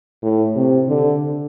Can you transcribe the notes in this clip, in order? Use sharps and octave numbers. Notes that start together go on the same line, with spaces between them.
A2
C3
D3